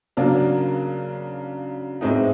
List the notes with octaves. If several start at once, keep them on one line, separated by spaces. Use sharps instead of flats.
C#3 F#3 A#3 D4
A2 E3 G#3 C4 D#4